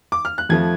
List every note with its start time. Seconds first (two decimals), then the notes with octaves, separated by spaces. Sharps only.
0.12 D6
0.25 F6
0.38 F#6
0.49 F2 F3 A3 G#6